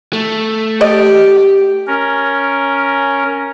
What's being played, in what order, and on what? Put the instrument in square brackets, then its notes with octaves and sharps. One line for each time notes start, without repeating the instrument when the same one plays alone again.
[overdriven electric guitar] A3
[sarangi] G4 [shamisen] A4 D5 D#5
[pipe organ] C#4 A#4